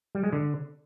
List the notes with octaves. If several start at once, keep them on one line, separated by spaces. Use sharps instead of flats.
G3
G#3
D3